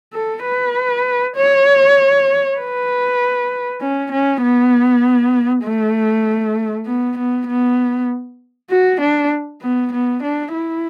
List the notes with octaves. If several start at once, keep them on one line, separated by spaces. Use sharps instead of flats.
A4
B4
C#5
B4
C#4
C#4
B3
A3
B3
B3
B3
F#4
D4
B3
B3
D4
E4